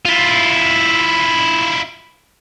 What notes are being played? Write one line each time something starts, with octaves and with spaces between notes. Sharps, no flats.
E4 F4